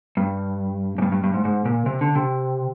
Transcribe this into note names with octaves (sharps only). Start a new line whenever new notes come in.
G2
G#2
G2
G2
G2
G#2
G#2
A#2
C3
D3
C3